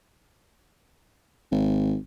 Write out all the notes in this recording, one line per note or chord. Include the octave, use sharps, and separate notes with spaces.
G#1